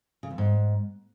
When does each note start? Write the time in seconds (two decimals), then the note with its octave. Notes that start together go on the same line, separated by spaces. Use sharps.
0.23 C#3
0.31 E2
0.38 G#2